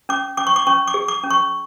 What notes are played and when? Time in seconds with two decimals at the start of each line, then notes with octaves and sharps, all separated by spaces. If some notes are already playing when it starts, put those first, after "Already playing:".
0.09 C#4 D6
0.37 C#4 D6
0.47 C#6
0.56 D6
0.67 C#4 C#6
0.88 D6
0.94 G#4
1.08 D6
1.24 C#4
1.30 C#6